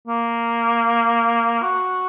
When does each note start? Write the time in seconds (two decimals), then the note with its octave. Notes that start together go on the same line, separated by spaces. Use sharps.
0.07 A#3
1.62 F#4